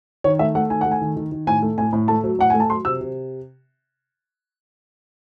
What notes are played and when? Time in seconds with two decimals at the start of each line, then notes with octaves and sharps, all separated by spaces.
0.24 D#3 C#5
0.39 A3 E5
0.55 A3 F#5
0.70 D#3 G#5
0.81 A3 F#5
0.91 G#5
1.01 D#3
1.17 D#3
1.32 D#3
1.47 A2 G#5
1.62 A3
1.78 A2 G#5
1.93 A2
2.08 A3 A5
2.24 F#3
2.39 A2 F#5
2.50 A3 G#5
2.60 A5
2.70 F#3 C6
2.85 C3 E6
3.01 C3